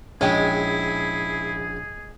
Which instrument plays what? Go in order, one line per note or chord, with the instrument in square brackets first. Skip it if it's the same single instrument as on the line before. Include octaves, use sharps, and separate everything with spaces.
[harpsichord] A#1 C#4 [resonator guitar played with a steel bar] G#3 G5 [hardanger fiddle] E4 [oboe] G#4